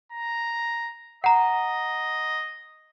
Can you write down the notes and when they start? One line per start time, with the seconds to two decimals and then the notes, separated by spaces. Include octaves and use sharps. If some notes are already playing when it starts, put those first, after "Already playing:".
0.12 A#5
1.24 D#5 F#5 A#5